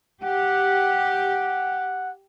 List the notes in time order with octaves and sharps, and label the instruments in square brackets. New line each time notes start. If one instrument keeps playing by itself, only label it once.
[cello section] G4 [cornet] F#5